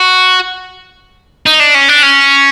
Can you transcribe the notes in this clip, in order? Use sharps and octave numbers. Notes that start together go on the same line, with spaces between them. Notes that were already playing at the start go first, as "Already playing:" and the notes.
Already playing: F#4
D#4
D4
C#4
D4
C#4